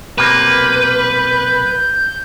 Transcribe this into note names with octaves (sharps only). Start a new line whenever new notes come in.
B1 C3 A#3 B4 G6